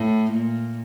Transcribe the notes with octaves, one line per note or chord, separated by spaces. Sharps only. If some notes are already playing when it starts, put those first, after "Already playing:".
Already playing: A2
A#2